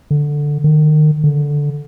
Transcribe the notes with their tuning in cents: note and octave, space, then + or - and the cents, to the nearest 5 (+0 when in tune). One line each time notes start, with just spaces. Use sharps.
D3 +0
D#3 -30
D3 -10